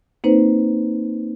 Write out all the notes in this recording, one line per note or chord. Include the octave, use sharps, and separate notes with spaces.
A#3 C4 D#4 B4 C5